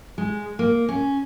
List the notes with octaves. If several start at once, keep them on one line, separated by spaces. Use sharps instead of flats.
G#3
A#3
C#4